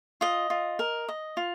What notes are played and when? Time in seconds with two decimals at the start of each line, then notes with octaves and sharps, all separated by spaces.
0.21 F4 D#5
0.50 F4
0.79 A#4
1.09 D#5
1.37 F4